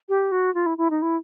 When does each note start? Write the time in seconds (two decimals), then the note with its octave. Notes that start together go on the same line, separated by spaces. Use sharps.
0.09 G4
0.32 F#4
0.54 F4
0.66 E4
0.78 E4
0.90 D#4
1.02 E4